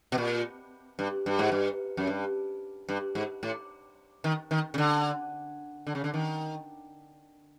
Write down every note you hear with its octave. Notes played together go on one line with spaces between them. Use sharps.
B2
A#2
G2
G2
G#2
G2
F#2
G2
G2
G#2
A2
D#3
D#3
C#3
D3
D3
C#3
D3
D#3